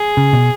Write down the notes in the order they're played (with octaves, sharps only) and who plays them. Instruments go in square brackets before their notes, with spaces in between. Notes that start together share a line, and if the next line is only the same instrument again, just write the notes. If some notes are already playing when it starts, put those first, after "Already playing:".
Already playing: [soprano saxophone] G#4
[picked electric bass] C#3
B2